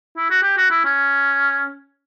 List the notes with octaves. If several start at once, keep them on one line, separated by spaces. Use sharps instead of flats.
E4
F#4
G4
F#4
E4
C#4